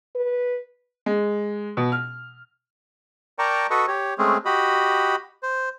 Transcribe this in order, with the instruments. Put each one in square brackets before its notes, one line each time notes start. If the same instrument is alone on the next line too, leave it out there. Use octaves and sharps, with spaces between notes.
[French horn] B4
[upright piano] G#3
B2
F6
[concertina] A#4 D5 G5 A5 A#5 C#6
F#4 A4 B4 D#5 C#6
G4 C#5
G#3 A3 C4 C#4 G#4
F#4 G4 D#5 B5
C5